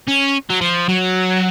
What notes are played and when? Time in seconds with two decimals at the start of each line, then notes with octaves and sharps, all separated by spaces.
0.07 C#4
0.50 F#3
0.61 F3
0.89 F#3